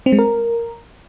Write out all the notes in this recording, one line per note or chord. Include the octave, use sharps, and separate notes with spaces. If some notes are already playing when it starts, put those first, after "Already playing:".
C4
G#3
A#4